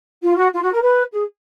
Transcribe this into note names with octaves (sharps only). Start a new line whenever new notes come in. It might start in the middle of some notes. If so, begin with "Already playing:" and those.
F4
F#4
F4
F#4
A#4
B4
G#4